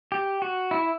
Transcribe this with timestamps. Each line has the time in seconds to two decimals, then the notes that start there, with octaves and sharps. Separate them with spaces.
0.12 G4
0.42 F#4
0.71 E4